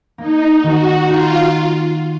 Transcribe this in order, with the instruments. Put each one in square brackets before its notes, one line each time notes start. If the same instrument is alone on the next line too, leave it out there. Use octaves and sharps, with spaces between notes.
[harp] A#3 [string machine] D#4
[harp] D#3 [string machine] F#4
[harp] D#4 [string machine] F4